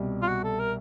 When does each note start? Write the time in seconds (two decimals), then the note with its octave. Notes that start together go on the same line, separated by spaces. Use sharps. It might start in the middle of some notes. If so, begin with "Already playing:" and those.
Already playing: C2 B2 G3
0.22 F4
0.28 F#4
0.44 A4
0.59 A#4